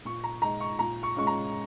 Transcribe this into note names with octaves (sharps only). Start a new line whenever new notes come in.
A#2 C#6
A#5
G#3 D#4 A#5
C#6
A#2 A#5
C#6
G#3 C#4 F4 C#6
A#5